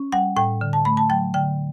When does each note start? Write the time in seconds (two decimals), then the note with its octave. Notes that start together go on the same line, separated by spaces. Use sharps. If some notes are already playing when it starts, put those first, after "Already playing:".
Already playing: C#4
0.12 G3 F#5
0.36 A2 G5
0.61 D3
0.73 A5
0.85 A3 B5
0.97 A5
1.10 F#3 G5
1.34 D3 G5